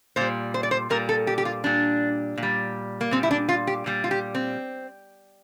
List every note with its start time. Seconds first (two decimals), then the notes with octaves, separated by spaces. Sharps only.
0.16 A#2 G3 C5
0.54 C5
0.63 D5
0.71 C5
0.90 A#2 G3 A#4
1.09 A4
1.27 G4
1.38 G4
1.45 F4
1.64 A#2 G3 D4
2.38 A#2
2.43 G3
3.01 A#3
3.11 A#2 G3 C4
3.23 E4
3.31 D4
3.49 F4
3.67 G4
3.86 A#2 G3
4.04 F4
4.11 G4
4.35 C4